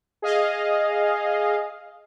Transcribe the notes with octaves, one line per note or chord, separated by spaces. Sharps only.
G#4 D#5 F5